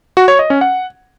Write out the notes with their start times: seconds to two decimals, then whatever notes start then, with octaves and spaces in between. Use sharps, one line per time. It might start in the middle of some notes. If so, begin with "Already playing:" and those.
0.17 F#4
0.28 C#5
0.39 D#5
0.50 C#4
0.61 F#5